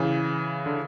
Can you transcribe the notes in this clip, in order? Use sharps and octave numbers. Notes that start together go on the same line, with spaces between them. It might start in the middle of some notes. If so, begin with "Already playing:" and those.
Already playing: C#3 E3
D3